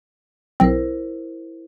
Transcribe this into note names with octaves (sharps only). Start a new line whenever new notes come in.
B1 C4 E4 A#4 C5